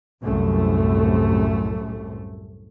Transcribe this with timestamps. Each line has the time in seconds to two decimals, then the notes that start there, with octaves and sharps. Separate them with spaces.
0.22 C2 F#2 A2 A3